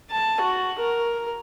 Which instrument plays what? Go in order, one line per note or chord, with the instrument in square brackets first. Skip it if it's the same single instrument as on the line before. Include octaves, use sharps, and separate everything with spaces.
[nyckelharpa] A5
F#4
A#4